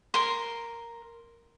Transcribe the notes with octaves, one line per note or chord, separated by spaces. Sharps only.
A#4 C6